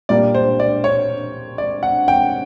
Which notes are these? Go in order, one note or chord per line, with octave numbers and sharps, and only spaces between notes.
A#2 G3 A#3 D4 D5
C5
D5
C#5
D5
F#5
G5